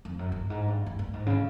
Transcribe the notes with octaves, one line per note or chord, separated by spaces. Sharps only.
F2
F#2
G2
G#2
G2
G2
G2
G#2
C#3